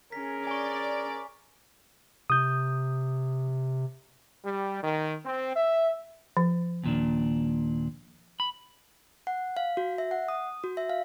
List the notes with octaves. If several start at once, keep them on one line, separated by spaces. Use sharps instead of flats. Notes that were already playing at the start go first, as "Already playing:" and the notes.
C#4 G#4 A#4 B6
D5 G#5 C#6
C3 D#6 G6
G3
D#3
C4
E5
F3
D#2 A#2 D4
B5
F#5
F5
F#4
E5
F#5
D#6
F#4
E5
F5